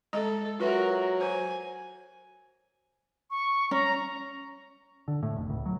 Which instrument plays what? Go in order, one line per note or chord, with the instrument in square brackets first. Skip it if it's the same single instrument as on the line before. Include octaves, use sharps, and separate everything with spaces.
[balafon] G#3 D#5 A#5 [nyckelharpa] A4
[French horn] F#3 [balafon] F4 B4 E5 [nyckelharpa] F#4 A#4
[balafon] F#4 C5 [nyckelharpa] G#5
[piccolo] C#6
[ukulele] C#4 [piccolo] A#5
[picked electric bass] D3
A2
F1
C#2
F#3